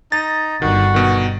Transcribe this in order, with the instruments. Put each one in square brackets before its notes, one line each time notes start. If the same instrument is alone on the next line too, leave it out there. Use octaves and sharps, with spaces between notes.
[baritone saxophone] D#4 [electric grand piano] A6
[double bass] G1 [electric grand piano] D#3 [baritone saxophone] F#4
[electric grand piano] B2 D#3